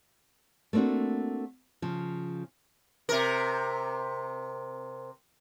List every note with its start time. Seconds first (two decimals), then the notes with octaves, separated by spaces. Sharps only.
0.73 A3 A#3 C4 D4 F#4
1.82 C#3 F3
3.09 C3 A#4